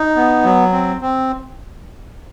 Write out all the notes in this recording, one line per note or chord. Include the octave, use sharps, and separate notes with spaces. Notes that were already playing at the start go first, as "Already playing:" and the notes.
Already playing: D#4
B3
F#3
C4
C4